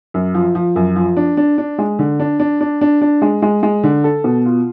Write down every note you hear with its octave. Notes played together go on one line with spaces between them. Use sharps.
F#2
F3
F3
F#2
F3
D4
D4
D4
G#3
D3
D4
D4
D4
D4
D4
G#3
G#3
G#3
D3
A4
B2
F4